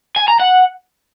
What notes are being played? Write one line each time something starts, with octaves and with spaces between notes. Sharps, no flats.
G#5
A#5
F#5